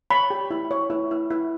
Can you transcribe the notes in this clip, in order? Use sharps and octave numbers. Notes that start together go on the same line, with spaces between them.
C#5 B5
G4
E4
C#5
E4
E4
E4